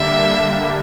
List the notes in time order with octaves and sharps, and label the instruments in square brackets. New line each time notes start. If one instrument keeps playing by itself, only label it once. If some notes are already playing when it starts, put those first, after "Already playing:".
Already playing: [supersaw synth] D3 G3 A#3 D4 [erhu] E5